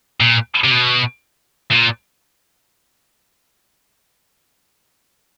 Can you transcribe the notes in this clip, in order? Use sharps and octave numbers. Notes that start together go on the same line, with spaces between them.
A#2
C3
B2
A#2